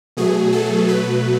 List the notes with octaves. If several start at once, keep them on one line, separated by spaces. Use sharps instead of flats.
B2 F#3 A3 G#4
A4
B2 F#3 A3 B4